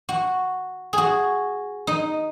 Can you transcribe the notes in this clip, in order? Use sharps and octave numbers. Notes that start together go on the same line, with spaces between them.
F#4
F#4 G#4
D#4